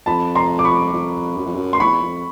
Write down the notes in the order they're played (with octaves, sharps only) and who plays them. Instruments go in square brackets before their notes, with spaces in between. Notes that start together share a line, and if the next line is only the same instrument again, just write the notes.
[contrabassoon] F2 [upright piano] A5 B5
[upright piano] A#5 C6
D6
B5 C#6
[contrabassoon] F2
F#2
F2
F#2
[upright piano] C6
[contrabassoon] E2 [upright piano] B5 C#6
[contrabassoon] F2